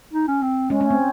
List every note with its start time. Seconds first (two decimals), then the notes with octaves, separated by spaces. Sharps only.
0.13 D#4
0.28 C#4
0.42 C4
0.70 G#3 C#4
0.81 C#4
0.85 A3
0.90 C4